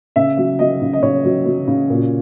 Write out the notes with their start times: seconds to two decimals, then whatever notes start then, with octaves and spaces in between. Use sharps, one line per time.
0.16 C#3 E5
0.37 F#3
0.59 F#3 D#5
0.81 C#3
0.93 D#5
1.03 C#3 C#5
1.24 F#3
1.46 F#3
1.67 C#3
1.90 A#2